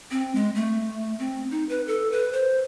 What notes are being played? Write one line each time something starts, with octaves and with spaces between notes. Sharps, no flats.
C4
G#3
A3
C4
D#4
B4
A4
B4
C5